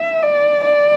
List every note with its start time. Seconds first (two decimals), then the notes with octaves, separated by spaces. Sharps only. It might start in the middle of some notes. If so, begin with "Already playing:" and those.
Already playing: E5
0.23 D5
0.64 D5